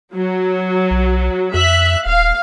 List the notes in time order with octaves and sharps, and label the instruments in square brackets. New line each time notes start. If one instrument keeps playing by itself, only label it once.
[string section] F#3
[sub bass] B1
[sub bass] F2 [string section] E5 F#6
[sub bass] D#1 [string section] F5